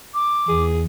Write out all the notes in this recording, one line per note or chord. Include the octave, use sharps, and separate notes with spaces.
D6
E2 G#4